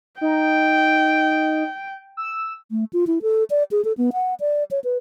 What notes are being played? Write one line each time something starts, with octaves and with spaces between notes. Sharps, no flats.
D#4 G5
E6
A3
F4
E4
A4
D5
G#4
A4
B3
F#5
D5
C#5
B4